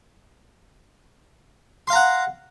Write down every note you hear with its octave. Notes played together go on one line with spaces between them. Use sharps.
F5 F#5 A#5 C6